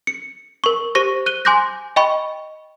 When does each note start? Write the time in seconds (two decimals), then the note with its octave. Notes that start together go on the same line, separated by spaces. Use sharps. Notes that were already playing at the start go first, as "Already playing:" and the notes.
0.07 C#7
0.64 A#4 C#6
0.95 G4 C5 C#6 A#6
1.26 F#6 D#7 G7
1.45 G#5 C6 D6 F#6 G6 A#6
1.96 D#5 G5 B5 C#6